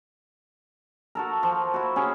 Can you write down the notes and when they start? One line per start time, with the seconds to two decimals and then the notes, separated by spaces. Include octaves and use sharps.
1.15 F#4 A4 A#4
1.43 F3
1.74 E4 F#4
1.96 C#4 F#4 G#4